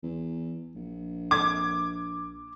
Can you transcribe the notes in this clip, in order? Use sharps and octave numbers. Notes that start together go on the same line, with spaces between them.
E2
A#1
D6 G#6